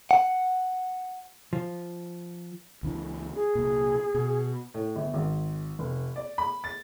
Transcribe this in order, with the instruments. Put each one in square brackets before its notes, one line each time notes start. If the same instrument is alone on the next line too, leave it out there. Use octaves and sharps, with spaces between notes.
[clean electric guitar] F#5
[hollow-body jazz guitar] F3
[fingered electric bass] C#2 E3 D4
[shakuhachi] G#4
[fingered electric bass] C2 A#2
B2
[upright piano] A2
G1
G#1
F1
D5
B5
A6